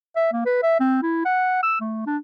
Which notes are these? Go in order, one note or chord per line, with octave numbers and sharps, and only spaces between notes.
E5
A#3
B4
E5
C4
E4
F#5
E6
A3
D4